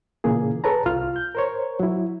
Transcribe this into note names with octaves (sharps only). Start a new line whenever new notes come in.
A#2 C#3 E3 A#3 G#4
G#4 A4 B4 C#5 A5 A#5
C2 F4 F6
G6
A#4 C5 C#5
F#3 E4